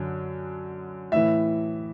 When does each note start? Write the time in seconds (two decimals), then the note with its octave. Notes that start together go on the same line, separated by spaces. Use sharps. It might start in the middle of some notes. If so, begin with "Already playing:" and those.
Already playing: F#2 D3
1.12 A2 E3 E5